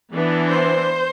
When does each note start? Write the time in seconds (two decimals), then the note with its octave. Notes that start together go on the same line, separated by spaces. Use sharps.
0.12 E3 B3 D4
0.47 C5